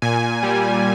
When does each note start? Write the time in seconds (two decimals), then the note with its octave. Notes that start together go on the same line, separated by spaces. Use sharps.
0.02 A#2 G#5
0.43 G3